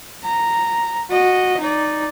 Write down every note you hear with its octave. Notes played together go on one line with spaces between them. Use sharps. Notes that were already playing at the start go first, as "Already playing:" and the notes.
A#5
F#4 D#5
D#4 D5